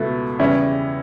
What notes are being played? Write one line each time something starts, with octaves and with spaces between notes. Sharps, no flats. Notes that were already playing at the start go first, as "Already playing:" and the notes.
Already playing: C#2 B2 A3 E4
E2 C#3 G3 C#4 E4